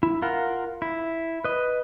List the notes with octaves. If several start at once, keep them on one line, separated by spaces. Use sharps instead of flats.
E4
F4 A#4 F5 F#5
E4
B4 D#5